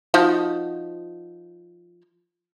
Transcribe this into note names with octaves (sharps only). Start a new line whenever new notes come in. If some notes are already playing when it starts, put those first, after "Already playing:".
F3 D#4 F#4